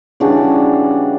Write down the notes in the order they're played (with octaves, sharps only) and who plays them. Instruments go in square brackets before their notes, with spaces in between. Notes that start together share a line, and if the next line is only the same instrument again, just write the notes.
[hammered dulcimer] C#3 E3 G3 D4 F#4